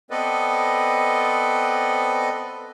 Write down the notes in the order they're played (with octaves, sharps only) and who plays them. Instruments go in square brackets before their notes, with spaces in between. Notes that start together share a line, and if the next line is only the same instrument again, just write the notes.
[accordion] B3 C4 A4 B4 D5 D#5